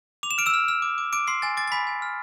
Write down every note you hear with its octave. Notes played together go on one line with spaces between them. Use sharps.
D6 F7
E7
F6 D7
E6 E7
F6
F6
D6
D6
D6 D7
C6 D6 C7
G#5 A6
D6 A6
A6
G#5 B5 B6
G#5
F6